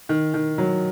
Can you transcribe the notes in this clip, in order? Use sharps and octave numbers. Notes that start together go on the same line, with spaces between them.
D#3
D#3
F#3